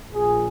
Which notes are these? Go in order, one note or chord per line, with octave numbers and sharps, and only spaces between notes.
A#1 A#2 G#4